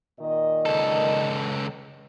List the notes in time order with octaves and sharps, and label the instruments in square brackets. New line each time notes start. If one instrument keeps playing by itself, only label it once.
[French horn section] A#2 D#3 D#5
[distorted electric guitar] C#2 A4